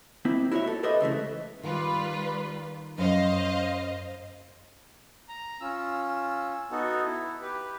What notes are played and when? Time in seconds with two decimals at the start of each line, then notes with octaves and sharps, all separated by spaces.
0.25 A#3 C4 E4
0.51 E4 F#4 A#4 C#5 E5
0.67 A4
0.83 G4 A4 B4 C5 D#5 E5
1.00 C#2 C#3 E3 A3
1.63 D#3 G3 F4 B4
2.98 F#2 C5 D#5 F5
5.29 A#5
5.61 C#4 F4 E6
6.71 B3 D#4 F#4 A4
7.04 E4
7.42 G4 B4